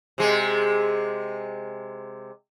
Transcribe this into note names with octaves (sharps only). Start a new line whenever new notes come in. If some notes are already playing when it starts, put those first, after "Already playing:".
C3 G#3